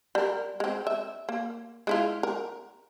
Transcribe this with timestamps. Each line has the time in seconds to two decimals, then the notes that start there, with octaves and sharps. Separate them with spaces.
0.15 G3 A#4
0.60 G#3 C4
0.87 E5
1.29 A#3
1.87 G#3 E4 F4
2.23 A#4